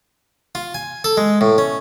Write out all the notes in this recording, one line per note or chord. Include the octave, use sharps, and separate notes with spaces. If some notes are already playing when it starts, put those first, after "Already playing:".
F4
G#5
A4
G#3
A2
C#4